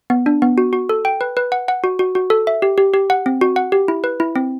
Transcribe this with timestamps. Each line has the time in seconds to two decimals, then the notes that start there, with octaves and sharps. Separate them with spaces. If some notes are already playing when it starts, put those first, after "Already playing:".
0.10 B3
0.26 D4
0.42 B3
0.58 F#4
0.73 F#4
0.89 A4
1.05 G5
1.21 B4
1.37 B4
1.52 F#5
1.68 F#5
1.84 F#4
1.99 F#4
2.15 F#4
2.30 A4
2.47 E5
2.62 G4
2.78 G4
2.94 G4
3.10 F#5
3.26 C4
3.41 F#4
3.56 F#5
3.72 G4
3.88 E4
4.04 B4
4.20 E4
4.36 C4